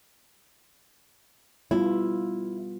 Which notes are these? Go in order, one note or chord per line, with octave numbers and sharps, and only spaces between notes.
G3 B3 E4 F4